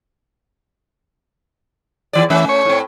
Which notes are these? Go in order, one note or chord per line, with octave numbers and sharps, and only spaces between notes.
E2 E3 D5
E3 A3 C#4
C#5
A2 C4